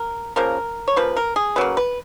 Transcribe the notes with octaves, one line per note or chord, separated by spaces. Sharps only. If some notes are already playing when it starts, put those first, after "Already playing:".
Already playing: A#4
C#3 F3 A#3 A#4
C#5
C#3 F3 A#3 B4
A#4
G#4
C#3 F#3 A#3 B4
B4